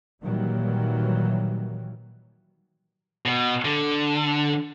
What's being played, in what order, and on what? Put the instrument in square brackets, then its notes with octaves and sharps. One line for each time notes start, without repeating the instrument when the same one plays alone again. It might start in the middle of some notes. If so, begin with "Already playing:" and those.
[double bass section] A#2 D#3 E3 F#3 G3 A#3
[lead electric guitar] B2
D3